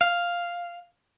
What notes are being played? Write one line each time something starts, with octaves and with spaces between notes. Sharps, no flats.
F5